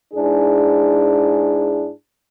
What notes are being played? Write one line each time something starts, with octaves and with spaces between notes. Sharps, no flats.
G#2 D4 E4 G#4